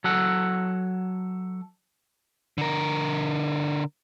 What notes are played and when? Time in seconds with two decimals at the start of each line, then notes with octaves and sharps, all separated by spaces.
0.04 F#3 A4 F#5
2.58 D3 A#4